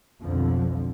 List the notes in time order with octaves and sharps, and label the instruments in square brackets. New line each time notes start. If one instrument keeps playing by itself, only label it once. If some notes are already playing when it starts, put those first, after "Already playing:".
[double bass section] B1 F2 D3 F3